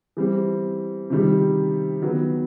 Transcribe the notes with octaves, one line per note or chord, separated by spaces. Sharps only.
E3 G3 C4
C3 D#3 G3
D#3 F#3 B3